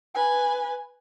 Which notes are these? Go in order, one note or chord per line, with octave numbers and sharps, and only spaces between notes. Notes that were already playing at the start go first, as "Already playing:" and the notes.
B4 G#5